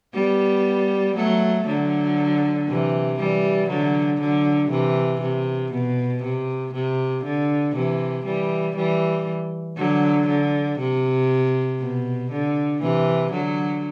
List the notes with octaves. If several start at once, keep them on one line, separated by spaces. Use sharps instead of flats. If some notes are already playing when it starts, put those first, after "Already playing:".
G3 B3
F#3 A3
D3 F#3
C3 E3
E3 G3
D3 F#3
D3 F#3
C3 E3
C3
B2
C3
C3
D3
C3 E3
E3 G3
E3 G3
D3 F#3
D3
C3
B2
D3
C3 E3
D3 F#3